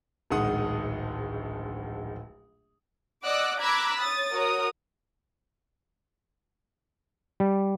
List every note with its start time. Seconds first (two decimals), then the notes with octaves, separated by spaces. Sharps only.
0.31 D1 A#1 D#3 G#3 F#5 D#6
3.25 D5 D#5 F#5 D6 E6 F#6
3.60 A#5 B5 D6 E6 F#6 G#6
4.00 C#5 D#6 A6
4.33 F#4 A#4 C#5 D#6
7.40 G3